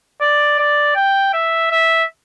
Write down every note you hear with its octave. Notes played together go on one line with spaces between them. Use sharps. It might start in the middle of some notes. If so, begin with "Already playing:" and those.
D5
D5
G5
E5
E5